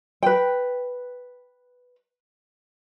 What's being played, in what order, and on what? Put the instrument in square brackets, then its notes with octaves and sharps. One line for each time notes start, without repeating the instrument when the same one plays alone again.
[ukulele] B4 G5